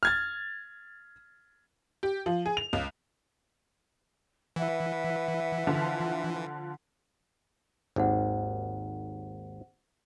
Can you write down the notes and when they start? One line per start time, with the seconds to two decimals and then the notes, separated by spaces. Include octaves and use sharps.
0.03 F6 G#6 A6
2.03 G4
2.26 F3
2.46 G#4
2.57 F7
2.73 C#2
4.56 E3 B4 E5 F#5
5.67 D3 F3 F4
7.96 G#1 D#2 C5 F#5